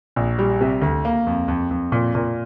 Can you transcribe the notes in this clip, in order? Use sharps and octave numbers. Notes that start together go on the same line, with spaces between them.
A#1
G3
C3
D2
A#3
F2
F2
F2
A#2
A#2